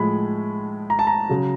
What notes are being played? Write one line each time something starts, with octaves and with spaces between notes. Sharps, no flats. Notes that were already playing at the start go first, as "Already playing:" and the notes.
Already playing: A2 F3 G#3 B5
A#5
A5
A#5
C#3 F#3